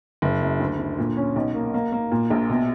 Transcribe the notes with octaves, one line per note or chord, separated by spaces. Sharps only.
F#1
F#2
D2
D3
A#2
C#4
B1
A#3
A#3
A#3
A#2
A#1
B2